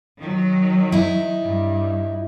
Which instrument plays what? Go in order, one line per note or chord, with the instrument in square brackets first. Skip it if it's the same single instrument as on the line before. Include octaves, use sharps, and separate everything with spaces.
[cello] D#3 F#3
[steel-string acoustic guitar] D#4 E4
[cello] G2